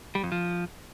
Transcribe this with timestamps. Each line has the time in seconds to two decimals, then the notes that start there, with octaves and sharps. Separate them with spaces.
0.15 G3
0.23 F2
0.32 F3